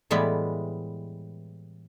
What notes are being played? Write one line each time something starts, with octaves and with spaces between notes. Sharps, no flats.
A2 E3 G3 G#3 B3